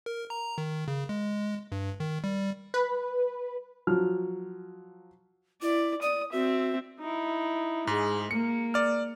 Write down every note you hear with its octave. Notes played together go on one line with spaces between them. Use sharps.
A#4
A#5
D#3
C#3
G#3
G2
D#3
G3
B4
F3 F#3 F6
E4 D5
D5 D#6
C4 F#4 E5
D#4 E4
G#2 G#3 G#4
A#3 C#7
D5 F6